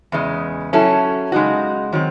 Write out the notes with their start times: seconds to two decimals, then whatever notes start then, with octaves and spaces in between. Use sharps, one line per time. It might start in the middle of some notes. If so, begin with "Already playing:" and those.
0.12 E2 C#3 G#3
0.73 F#3 C#4 E4 A4
1.32 C#3 G#3 D#4 F#4
1.92 D#3 F#3 C4